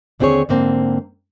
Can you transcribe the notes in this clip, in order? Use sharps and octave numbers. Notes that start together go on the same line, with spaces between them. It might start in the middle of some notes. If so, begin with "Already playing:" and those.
D#2 D3 C4 F4 G#4 C#5
G#2 D3 A#3 C4